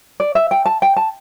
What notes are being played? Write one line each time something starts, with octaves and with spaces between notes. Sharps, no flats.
D5
E5
G5
A5
G5
A5